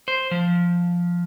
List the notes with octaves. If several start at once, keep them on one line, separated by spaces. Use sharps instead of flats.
C5
F3